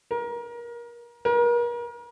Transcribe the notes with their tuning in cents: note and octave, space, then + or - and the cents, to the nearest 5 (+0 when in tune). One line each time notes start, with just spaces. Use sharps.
A#4 +30
A#4 +40